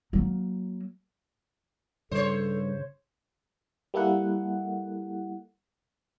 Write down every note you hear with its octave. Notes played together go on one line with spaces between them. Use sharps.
F#3 A#3
G2 C#3 A4 C5 C#5
G3 A#3 E4 A4 F#5